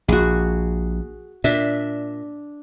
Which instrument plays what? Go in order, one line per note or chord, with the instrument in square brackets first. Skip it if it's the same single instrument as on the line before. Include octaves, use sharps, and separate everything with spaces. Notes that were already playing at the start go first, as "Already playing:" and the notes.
[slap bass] A#1 [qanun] F#4 G#4
[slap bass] A#2 [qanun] D4 E5